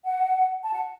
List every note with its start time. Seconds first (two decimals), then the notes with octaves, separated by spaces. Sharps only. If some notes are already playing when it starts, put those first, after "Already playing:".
0.04 F#5
0.62 A5
0.72 F#5